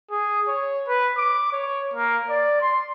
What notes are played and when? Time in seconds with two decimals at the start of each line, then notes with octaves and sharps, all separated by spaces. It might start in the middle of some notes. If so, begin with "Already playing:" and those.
0.11 G#4
0.48 C#5
0.87 B4
1.18 D6
1.53 C#5
1.94 A#3
2.29 D5
2.61 C6